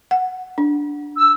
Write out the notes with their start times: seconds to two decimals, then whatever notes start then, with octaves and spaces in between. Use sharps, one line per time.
0.11 F#5
0.58 D4
1.16 E6